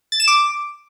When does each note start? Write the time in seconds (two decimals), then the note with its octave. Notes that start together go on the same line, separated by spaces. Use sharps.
0.12 A6
0.20 E7
0.28 D6